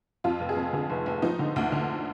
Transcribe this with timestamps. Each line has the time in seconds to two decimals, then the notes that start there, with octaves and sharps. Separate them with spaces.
0.24 F2 F4
0.40 F1
0.49 G#4
0.56 F2
0.73 D3 G#4
0.90 F1
1.06 F1
1.22 F3 D#4
1.39 D3
1.56 D2
1.72 D3